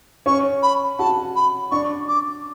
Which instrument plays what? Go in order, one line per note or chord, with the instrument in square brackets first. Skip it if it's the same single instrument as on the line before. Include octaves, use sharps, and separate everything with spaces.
[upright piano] C#4 C#5 [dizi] C#6
[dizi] B5
[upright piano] F#4 F#5 [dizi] A5
[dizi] B5
[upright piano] D4 D5 [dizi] C#6
[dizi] D6